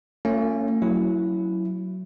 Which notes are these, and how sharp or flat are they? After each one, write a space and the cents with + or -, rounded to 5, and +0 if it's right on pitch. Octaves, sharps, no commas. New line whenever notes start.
A3 +40 C#4 +0 F4 +0
F#3 +0 E4 +5